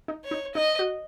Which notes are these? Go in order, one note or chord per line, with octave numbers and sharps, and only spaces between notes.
D#4
C#5
D#4
D#4 D#5
F#4